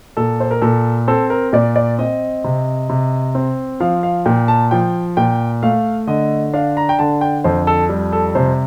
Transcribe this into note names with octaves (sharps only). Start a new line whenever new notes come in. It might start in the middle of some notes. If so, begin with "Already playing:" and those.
A#2 A4
C5
A#4
A#2 A4
C4 A4
A#4
A#2 D5
D5
C4 D#5
C3
C3
C4
F3 F5
F5
A#2 G5
A5
F3 G5
A#2 G5
A3 F5
D3 D#5
D4 F5
A#5
G5
D3 A5
G5
F2 C5
A4
G3
A4
C3 C5